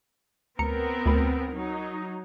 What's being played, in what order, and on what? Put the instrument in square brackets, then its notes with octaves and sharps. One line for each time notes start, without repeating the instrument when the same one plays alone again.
[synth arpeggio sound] D2 A#5 C#7 [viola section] B3 C4 A#4
[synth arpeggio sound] D2 B5
[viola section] F#3 D#4